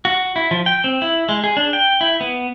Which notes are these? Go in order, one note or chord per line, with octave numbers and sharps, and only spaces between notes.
F#4
E4
F3
G5
C4
E4
G#3
G#4
D4
G5
E4
B3